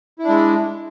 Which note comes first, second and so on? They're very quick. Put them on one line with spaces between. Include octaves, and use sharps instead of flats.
E4 D4 G#3